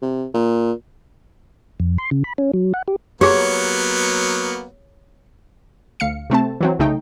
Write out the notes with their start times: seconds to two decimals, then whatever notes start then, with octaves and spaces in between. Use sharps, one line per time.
0.02 C3
0.34 A#2
1.80 F2
1.98 C6
2.11 C#3
2.24 B5
2.38 C#4
2.53 F#3
2.74 F#5
2.88 G4
3.21 F#3 A#3 B3 G4 G#4 C#5
6.00 D2 F5 C#7
6.30 C3 A3 C4 A5
6.61 E3 F#3 C4
6.79 C2 C#3 A3 D#4 G5